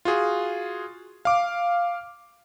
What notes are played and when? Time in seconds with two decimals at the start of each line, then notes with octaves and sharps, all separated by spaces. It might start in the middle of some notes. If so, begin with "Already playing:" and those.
0.05 F4 F#4 G#4
1.25 F5 D6